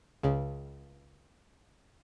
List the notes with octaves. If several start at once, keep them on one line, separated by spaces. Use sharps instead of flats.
C#2 C#3